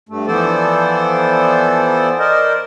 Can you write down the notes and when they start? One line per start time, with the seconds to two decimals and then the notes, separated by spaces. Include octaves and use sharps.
0.09 G2 A3
0.27 E3 F3 B3 A4 C5 D5
2.19 A#4 C5 D5 D#5